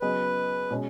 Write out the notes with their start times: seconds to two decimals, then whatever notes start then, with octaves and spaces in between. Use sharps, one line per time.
0.01 C#3 F#3 B3 G#4 B4 D#5
0.70 B2 G#3 C#4